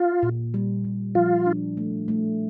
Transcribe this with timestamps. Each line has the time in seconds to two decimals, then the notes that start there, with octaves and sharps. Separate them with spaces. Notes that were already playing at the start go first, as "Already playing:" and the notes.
Already playing: F4
0.23 A#2
0.54 G3
0.84 A#2
1.15 F3 F4
1.46 D4
1.77 A3
2.08 A3